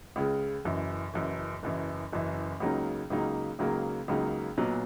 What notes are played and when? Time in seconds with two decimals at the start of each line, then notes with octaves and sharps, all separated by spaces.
0.16 C#2 C#3 G#3
0.65 F#1 F#2 E3
1.14 F#1 F#2 E3
1.63 F#1 F#2 E3
2.13 F#1 F#2 E3
2.60 C#2 C#3 F#3 A#3 D#4
3.10 C#2 C#3 F#3 A#3 D#4
3.59 C#2 C#3 F#3 A#3 D#4
4.08 C#2 C#3 F#3 A#3 D#4
4.58 B1 A#2 F#3 B3